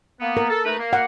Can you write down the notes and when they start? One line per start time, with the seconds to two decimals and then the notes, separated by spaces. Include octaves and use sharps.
0.20 A#3 B3
0.37 A#4
0.50 A4
0.65 A3 D#4 B4
0.79 A#3
0.93 F#5